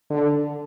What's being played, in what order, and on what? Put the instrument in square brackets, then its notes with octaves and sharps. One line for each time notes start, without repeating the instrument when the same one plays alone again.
[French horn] D3